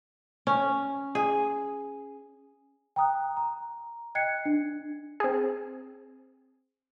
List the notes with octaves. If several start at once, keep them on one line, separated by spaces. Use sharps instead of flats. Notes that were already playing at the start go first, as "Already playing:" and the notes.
C#4
G#4
G5 A#5 D#6 F#6
A#5
D#5 G5 F#6 G#6 C7 C#7
D4
C4 G#4